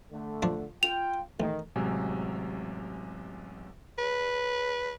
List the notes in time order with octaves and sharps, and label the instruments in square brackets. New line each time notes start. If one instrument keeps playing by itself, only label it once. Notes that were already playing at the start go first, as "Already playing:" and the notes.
[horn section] D3 A3
[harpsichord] F3 D4
[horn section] F4 G5 [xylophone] F7
[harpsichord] A1 [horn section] D#3
[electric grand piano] A1 C3 F#3 G#3 G#5
[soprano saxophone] B4